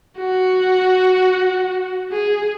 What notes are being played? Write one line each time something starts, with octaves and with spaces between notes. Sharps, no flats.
F#4
G#4